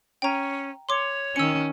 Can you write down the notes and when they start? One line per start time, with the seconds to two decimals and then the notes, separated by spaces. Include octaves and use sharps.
0.22 C#4 G5 A#5
0.89 C#5 C6 D6
1.36 D#3 C#4 E6 C#7